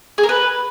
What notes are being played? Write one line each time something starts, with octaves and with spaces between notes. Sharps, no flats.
G#4
A#4
B4